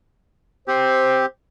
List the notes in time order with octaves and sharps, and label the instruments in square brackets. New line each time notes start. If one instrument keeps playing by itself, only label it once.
[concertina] C4 G4 [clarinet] C5